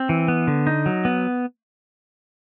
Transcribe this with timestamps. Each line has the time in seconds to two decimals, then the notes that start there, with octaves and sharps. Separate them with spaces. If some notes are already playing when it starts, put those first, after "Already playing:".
Already playing: C4
0.09 E3
0.28 B3
0.47 D3
0.67 D#4
0.86 F#3
1.05 B3